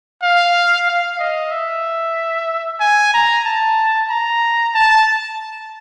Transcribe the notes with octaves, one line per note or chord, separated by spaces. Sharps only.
F5
F5
D#5
E5
G#5
A#5
A5
A#5
A5